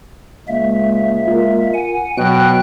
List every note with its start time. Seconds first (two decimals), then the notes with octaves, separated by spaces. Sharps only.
0.48 C#2 G#3 A#3 E5
1.28 F4 A#4
1.74 F#5 G#5
2.18 B2 F#3 F#4 G5 F#6